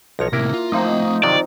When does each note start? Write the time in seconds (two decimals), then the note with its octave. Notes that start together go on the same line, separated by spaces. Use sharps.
0.19 B1 F3 C#5 A#6
0.33 A2 C3 A#3 E4 A#4
0.53 F4
0.72 F3 A3 C4 D#4 F5
1.23 C3 D#3 F#3 D5